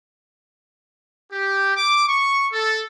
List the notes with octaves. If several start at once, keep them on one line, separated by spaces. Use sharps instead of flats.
G4
D6
C#6
A4